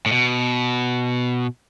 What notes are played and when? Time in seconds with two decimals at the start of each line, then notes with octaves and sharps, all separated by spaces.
0.06 A2
0.12 B2